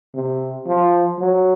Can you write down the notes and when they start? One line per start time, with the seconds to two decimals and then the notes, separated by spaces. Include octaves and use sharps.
0.15 C3
0.67 F3
1.20 F#3